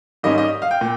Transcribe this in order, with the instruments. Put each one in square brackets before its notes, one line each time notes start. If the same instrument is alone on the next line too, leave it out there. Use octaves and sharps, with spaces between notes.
[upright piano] G#2 D#3 G3 C#4 D#5
D#5
F5
G5
A#2